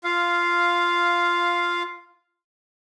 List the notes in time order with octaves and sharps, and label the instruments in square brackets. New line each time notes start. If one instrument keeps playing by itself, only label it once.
[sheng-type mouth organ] F4 F5